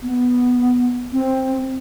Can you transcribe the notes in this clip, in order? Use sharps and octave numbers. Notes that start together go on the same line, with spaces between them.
B3
C4